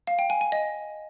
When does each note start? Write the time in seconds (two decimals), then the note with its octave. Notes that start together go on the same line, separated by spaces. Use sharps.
0.07 F5
0.19 G5
0.30 G#5
0.41 G#5
0.52 D#5